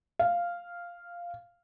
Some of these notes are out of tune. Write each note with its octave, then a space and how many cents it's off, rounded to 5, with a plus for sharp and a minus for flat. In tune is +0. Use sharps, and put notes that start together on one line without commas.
F5 -5